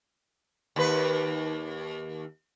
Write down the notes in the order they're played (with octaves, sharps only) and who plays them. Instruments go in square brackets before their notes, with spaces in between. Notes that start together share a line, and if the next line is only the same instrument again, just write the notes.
[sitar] D#2 B4